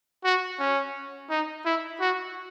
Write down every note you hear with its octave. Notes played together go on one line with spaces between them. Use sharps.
F#4
C#4
D#4
E4
F#4